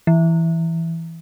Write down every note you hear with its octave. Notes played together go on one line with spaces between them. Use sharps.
E3